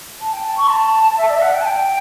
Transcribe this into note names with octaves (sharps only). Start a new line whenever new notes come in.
A5
G5
A5
C#6
A5
E5
D5
E5
F#5
G5
A5
G5